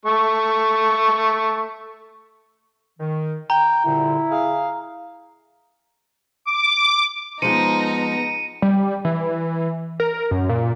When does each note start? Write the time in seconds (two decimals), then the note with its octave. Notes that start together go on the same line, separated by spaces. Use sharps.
0.06 A3 C#6
2.99 D#3
3.50 G5 A#5
3.86 C2 A#2 D3 E4
4.31 G#4 F5
6.45 D6
7.42 F3 G#3 B3 D#4 A#5 C#7 D#7
8.62 G3
9.05 E3
10.00 A#4
10.31 F#2
10.49 A#2